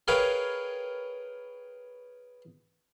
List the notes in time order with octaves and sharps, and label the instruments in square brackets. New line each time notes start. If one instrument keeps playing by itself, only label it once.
[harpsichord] G#4 A#4 B4 C#5 F5 G5